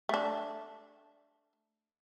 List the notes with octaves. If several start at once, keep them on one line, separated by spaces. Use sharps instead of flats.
A3 D4